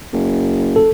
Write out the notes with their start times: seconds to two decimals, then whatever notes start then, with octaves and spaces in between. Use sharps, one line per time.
0.13 F#1
0.76 A4